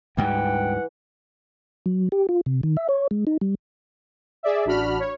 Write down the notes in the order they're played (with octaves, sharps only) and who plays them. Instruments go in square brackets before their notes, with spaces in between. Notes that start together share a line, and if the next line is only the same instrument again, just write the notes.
[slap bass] D2 G#2 G3 [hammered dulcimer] E3 [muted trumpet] F#5 [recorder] G5
[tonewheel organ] F#3
G4
F4
C3
D#3
E5
C#5
G#3
D#4
G3
[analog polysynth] G#4 D5 E5
A1 D4 F#4 B5 F6
C#5